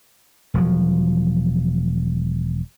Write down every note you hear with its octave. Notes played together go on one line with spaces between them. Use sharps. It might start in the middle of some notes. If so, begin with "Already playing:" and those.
E1 F3 F#3